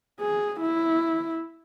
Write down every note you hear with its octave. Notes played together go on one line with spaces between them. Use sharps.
G#4
E4